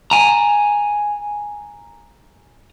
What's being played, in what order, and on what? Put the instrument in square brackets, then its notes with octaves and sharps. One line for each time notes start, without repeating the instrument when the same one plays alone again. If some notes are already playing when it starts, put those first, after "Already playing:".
[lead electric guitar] G#5 A#5